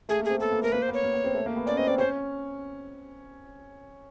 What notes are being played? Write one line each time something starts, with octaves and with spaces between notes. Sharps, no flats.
A3 G#4
A#3
C4 G#4
B3 A4
A#3
A3 A#4
A#3 B4
C5
B3
C#5
A#3
B3
C4
A3
A#3
B3
C#4 D5
C4 D#5
C4 D5
C#4 C5